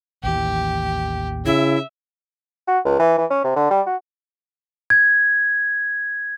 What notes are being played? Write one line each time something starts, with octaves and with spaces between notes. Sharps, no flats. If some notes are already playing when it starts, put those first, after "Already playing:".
A1 D#2 E3 G4
C#3 E4 E5
F#4
C#2
E3
E3
C#4
C3
D3
G3
F#4
G#6